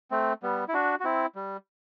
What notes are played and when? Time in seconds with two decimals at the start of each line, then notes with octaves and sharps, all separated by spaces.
0.11 A3 C4
0.43 G3 B3
0.68 E4
0.74 D4 F#4
1.00 F#4
1.04 C4 E4
1.35 G3